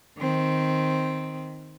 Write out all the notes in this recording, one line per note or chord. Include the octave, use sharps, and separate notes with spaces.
D#3 C4